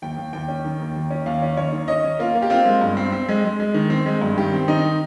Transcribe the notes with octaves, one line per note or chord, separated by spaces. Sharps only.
D#2 G5
D#2
D#2 G5
C#4
D#3
D#2
D#2
C#4
D#2 F5
C#4
D#2 C#5
D#3
C#4 D#5
C#4
A#3 F4
A#3
G4
C4 F4
G#3
G2
C4
C4
G#3
G#3
G#3
D#3
C4
G#3
G2
D#3 G4
C4
D#3 D#4